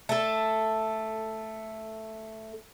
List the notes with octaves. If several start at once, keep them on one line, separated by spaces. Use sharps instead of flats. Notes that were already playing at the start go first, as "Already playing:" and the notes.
A3 A4